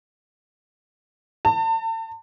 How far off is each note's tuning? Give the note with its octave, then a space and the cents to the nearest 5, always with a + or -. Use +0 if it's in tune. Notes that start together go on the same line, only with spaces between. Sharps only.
A5 +40